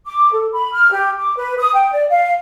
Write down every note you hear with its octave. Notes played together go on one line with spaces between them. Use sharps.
D6
A4
B5
F6
G4
D6
B4
D#6
G5
D5
F5